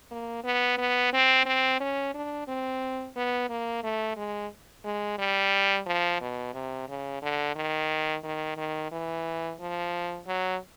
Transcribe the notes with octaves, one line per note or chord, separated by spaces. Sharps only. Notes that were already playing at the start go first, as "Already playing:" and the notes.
A#3
B3
B3
C4
C4
C#4
D4
C4
B3
A#3
A3
G#3
G#3
G3
F3
B2
C3
C#3
D3
D#3
D#3
D#3
E3
F3
F#3